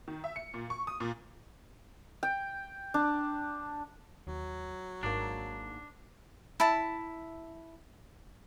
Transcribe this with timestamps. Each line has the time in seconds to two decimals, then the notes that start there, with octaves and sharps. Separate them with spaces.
0.08 D#3
0.24 E5
0.36 C#7
0.54 A#2
0.70 C#6
0.87 D#6
1.00 A#2
2.23 G5
2.94 D4
4.27 D#2 F#3
5.03 G#1 G#2 A#3 D4
6.60 E4 A5